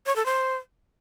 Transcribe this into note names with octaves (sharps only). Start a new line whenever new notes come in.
C#5
A4
C5